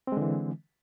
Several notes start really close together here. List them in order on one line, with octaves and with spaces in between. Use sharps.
C4 G#3 D3 E3